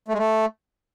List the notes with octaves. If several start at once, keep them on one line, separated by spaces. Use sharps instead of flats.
A3
G#3
A3